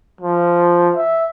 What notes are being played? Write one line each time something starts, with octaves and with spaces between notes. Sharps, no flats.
F3
E5